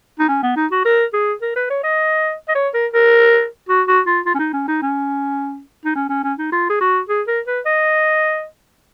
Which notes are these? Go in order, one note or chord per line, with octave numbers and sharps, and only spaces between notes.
D#4
C#4
B3
D#4
F#4
A#4
G#4
A#4
B4
C#5
D#5
D#5
C#5
A#4
A#4
F#4
F#4
F4
F4
C#4
D#4
C#4
D#4
C#4
D#4
C#4
C#4
C#4
D#4
F4
G#4
F#4
G#4
A#4
B4
D#5